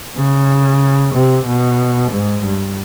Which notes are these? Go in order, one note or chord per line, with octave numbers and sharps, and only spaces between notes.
C#3
C3
B2
G#2
G2